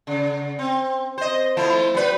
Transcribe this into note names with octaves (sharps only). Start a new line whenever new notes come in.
C#3
C4
C5 D#5
F3 A3 E4
F#3 B4